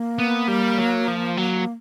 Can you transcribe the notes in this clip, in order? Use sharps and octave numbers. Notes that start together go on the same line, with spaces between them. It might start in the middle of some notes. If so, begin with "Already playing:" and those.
Already playing: A#3
B3
G3
F#3
F3
F#3